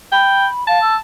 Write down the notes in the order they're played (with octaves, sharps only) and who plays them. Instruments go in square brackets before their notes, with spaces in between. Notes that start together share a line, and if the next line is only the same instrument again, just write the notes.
[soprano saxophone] G5 [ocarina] B5
[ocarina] F5 [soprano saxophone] A5
[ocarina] E6